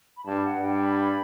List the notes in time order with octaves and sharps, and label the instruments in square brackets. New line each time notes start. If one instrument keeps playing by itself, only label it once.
[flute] B5
[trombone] G2 [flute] A5
[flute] F#5
[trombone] G2
[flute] G5
B5